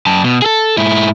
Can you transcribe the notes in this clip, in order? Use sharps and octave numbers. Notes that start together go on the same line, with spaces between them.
F#2 A5
B2
G#4 A4
G#2 E4